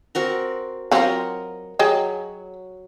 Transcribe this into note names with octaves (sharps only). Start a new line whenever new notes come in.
C4 F#4 A#4
F#3 C4 F4 A#4 D#5 F#5
F#3 G#4 D#5 G5